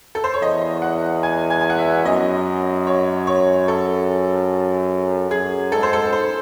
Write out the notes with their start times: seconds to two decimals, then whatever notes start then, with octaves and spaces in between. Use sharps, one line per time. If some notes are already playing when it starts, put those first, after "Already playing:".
0.15 A4
0.24 C5
0.34 C#5
0.42 E2 D#5
0.82 F#5
1.23 G#5
1.50 G#5
1.61 G#5
1.70 F#5
1.78 E5
2.05 F#2 D#5
2.87 C#5
3.27 C#5
3.68 A4
5.31 F#2 G#4
5.72 G#2 A4
5.83 C5
5.93 A4
6.12 C5